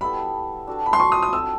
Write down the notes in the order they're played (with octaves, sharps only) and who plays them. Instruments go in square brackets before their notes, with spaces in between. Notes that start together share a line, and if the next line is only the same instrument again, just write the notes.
[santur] G3 B3 E4 A4 [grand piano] B5
[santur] D4 F#4 A4
[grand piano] B5
C6
C#6
D#6
D#6
[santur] C4 E4 A4 [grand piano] E6